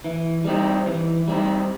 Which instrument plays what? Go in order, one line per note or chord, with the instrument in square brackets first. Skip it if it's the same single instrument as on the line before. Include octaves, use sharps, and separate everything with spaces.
[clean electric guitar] E3
G3 C4 D#4
E3
G3 C4 D#4